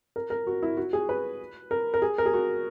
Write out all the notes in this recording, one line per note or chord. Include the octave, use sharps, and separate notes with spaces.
A#4
A#4
F#4
E4
F#4
G#4
B4
A#4
A#4
G#4
A#4
G#4
F#4